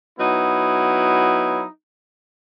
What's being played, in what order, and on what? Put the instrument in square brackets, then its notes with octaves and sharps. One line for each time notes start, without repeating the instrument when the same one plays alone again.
[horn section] F#3 B3 D#4 E4